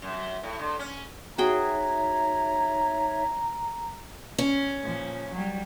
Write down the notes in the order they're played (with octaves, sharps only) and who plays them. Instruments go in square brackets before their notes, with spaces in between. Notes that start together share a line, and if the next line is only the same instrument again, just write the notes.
[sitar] F#2
A2
D3
C#4
[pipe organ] D#4 C#5 E5 [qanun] F#4 G#4 G5 [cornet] A#5
[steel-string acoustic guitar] C#4
[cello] A#2 F3
F#3 G3